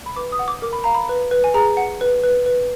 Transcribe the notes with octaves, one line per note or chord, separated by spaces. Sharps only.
B5
B4 D6
D#6
F#5
D6
A#4 D6
B5
F5 A#5
B5
B4
B4
G#5
G#4 A#5
F#5
B4
B4
B4